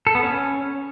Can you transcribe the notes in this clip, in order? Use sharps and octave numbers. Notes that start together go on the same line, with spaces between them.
A4
B3
C#4